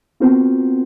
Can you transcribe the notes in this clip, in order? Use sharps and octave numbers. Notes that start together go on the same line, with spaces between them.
B3 C4 F4 F#4 A#4 C5